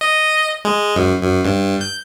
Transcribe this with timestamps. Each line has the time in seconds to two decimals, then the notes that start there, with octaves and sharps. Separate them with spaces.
0.01 D#5
0.65 G#3
0.96 F#2
1.22 F#2
1.45 G2
1.81 G6